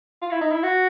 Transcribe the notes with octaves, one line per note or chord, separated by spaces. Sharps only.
F4
E4
D#4
E4
F#4